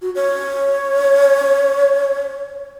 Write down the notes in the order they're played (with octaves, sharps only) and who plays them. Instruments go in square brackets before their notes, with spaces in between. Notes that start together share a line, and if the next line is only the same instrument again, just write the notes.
[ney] F#4
C#5